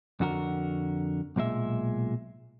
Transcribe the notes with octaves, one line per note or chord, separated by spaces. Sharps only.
F2 D3 F#4 G#4 A#4
B1 A#2 G#3 E5